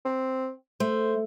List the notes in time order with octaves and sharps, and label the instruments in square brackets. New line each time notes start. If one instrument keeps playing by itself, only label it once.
[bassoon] C4
[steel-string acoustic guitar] A3 [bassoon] C5